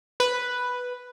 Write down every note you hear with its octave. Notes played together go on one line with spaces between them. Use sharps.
B4